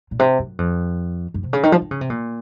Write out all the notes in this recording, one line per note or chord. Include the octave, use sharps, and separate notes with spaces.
A#2
C3
F#2
F2
F#2
C3
C#3
D#3
F3
D#3
C#3
C3
A#2